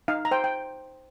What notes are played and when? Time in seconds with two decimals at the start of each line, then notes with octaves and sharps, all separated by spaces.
0.08 D#4 F5
0.25 A#5
0.31 C5 G5
0.44 G5